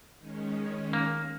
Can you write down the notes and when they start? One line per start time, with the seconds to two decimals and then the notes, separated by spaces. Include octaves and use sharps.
0.19 D#3 G#3 C#4
0.93 A#3